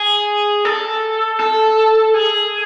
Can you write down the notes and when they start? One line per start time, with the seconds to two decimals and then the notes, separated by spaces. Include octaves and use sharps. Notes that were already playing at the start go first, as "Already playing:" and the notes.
Already playing: G#4
0.65 A4
1.40 A4
2.14 G#4